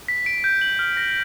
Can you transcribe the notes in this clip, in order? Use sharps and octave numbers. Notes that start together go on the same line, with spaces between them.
B6
D7
G6
F#7
F6
A#6